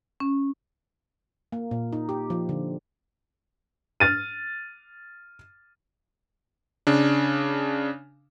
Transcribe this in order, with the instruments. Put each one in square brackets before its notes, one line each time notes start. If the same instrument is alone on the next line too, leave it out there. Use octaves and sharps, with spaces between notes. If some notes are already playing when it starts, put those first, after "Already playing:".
[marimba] C#4
[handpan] A#3
A#2
D#4
G4
F3
D3
[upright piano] F6 A6 D#7
[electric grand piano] C#3 D4